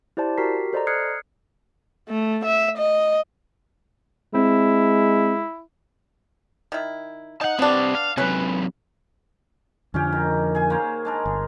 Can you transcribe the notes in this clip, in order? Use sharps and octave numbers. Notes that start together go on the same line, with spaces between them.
E4 G4 C5 D5 A5
F#4 G4 A#4 A#5 B6 C7
A4 C5 D5 D#5 A#5
D#6 F6 F#6 G#6 C7 C#7
A3
E5
D#5
G#3 C4 E4
D#3 E4
D#4 F#5 A5
G3 B3 C4 D4
F5
C3 F#3 C#4 B4
F2 D3 F3 C#4 G4
D#3
G#4 G#5
A#3 C5 C#5
G#3 D4 A#4
G1